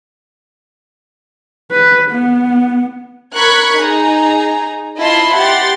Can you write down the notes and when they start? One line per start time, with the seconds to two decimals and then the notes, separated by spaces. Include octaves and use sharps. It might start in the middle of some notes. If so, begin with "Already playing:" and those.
1.71 B4
2.11 B3
3.34 A#4 B5 C#6 F#6 G#6
3.79 D#4 G#4 A#5
5.01 E4 F4 D#5 A5 C6
5.35 G4 F#5 C6 A6